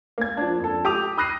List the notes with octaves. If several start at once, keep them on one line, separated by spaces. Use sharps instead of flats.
A#3 G#6
F3 D4
F2 A4
G4 D6 D#6 F7
B5 D#6 F#6 A#6 C7 D#7